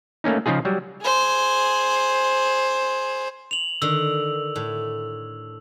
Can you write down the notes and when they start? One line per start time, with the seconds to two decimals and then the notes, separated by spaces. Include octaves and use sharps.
0.24 A3 A#3 C#4 D#4
0.46 C#3 F3 D#4 F4 G#4
0.65 F#3 G3
1.02 G#4 C5
3.51 F7 F#7
3.82 D3 D#3 E6
4.56 A2